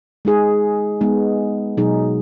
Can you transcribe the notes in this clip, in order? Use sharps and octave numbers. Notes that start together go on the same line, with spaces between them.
G#3 D#4 G#4
G#3 B3 D#4
B2 F#3 D#4 G#4